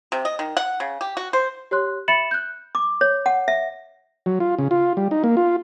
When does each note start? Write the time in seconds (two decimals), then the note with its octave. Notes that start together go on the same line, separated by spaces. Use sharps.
0.12 C3
0.25 D#5
0.39 D#3
0.57 F#5
0.80 C#3
1.01 G4
1.17 F#4
1.33 C5
1.71 G4 C#5 C6 F#6
2.08 E5 B5 A6 C#7 E7 F#7
2.31 F#6 G6
2.75 D6
3.01 C#5
3.26 F#5
3.48 E5
4.26 F#3
4.40 F4
4.59 C#3
4.71 F4
4.97 G3
5.11 D#4
5.24 A#3
5.37 F4